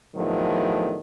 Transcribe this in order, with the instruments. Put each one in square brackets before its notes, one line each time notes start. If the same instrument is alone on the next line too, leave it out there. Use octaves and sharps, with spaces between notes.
[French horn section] E2 A2 D3 D#3 F3 F#3